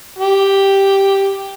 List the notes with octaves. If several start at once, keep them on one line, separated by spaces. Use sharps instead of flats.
G4